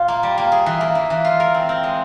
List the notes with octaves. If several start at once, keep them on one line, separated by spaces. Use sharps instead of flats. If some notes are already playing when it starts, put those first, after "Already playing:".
Already playing: A#2 F4
A#3
G3
A#3
G#4
E3
A#3
E3
E3
F4
A#4
C4
C4
G#3